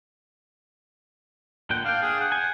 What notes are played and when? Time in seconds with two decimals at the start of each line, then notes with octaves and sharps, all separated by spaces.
1.70 A#2 D3 F#5 G5
1.84 D4 F5 G5
2.02 G#4
2.20 F#5
2.32 G#5